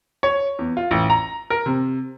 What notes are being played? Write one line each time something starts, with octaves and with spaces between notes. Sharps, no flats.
C#5
E2
F4
A1
A#5
A#4
C3